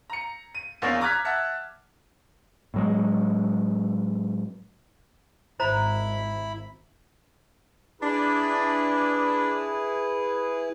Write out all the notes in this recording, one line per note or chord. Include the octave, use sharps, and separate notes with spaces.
A#5 C#7
D#7
A#1 E2 C#4 A#4 D5 F5
A#5 D6 F6 F#6 G#6 B6
E5 F#5 A5
A2 F#3 G#3
G#1 E4 C5 A#5 B5
D4 E4 G#4 B4 D5 B5